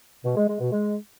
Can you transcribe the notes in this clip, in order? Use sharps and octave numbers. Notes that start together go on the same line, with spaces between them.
B2
G#3
G#3
B2
G#3